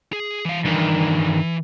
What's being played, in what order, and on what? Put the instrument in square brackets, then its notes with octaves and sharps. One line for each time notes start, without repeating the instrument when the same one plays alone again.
[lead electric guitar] G#4
E3 F5
[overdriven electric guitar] G2 D#3 [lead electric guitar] E3